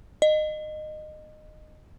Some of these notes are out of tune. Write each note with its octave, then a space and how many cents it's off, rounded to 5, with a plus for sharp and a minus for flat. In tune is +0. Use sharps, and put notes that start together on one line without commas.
D#5 -20